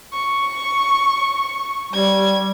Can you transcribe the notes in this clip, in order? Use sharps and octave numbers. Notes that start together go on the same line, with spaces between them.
C#6
G3 G#6